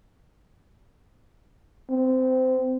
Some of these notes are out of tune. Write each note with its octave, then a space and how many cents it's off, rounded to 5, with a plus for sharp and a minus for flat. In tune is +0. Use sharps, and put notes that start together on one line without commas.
C4 -20